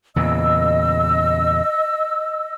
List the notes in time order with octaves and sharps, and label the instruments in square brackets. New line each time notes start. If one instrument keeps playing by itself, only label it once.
[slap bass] E2 A#2 C#3 [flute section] D#5 E6